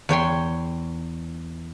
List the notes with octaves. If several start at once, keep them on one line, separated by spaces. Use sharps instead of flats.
E2 C#5 G5 C6